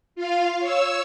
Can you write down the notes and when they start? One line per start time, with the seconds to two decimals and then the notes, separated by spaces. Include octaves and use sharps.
0.15 F4 F5
0.60 C#5 E6